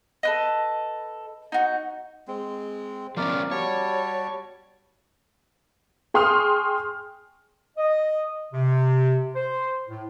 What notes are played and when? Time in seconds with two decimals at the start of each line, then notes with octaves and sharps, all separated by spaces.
0.23 A4 B4 D#5
1.52 D#4 F#4
2.28 G#3 C4
3.17 F3 B3 C#4 A#4 D5
3.51 G3 F#4 C#5 A5
6.14 G#4 G5 C6 C#6 D#6 F6
7.77 D#5
8.53 C3
9.35 C5
9.88 A2